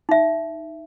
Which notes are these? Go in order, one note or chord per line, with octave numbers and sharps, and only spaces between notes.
D#4 E5